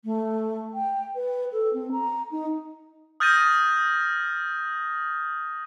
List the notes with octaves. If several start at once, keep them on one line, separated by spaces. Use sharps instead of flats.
A3
G5
B4
A4
C4
A#5
D#4
D#6 F6 G6 A6 A#6 D#7